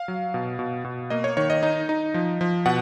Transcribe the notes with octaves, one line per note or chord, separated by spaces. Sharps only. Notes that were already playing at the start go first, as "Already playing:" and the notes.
Already playing: F5
F#3
B2
B2
B2
A#3 D#5
C#5
D#3 C#5
D#5
D#4
D#4
F3
F3
B2 F#5